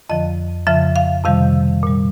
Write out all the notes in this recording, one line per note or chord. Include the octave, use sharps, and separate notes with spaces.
F2 D3 F3 D#5
F2 C#3 F3 E5
F5
F2 C3 D#3 G3 F5
A#2 G3